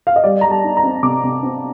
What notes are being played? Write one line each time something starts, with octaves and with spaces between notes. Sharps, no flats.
F5
D#5
G3 D5
G3 A#5
A5
D#4
A#5
C4
C3 D6
C3
C4